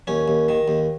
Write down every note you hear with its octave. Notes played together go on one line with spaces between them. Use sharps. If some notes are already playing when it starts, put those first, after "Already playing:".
D#2 C#4
D#2
D#3
D#2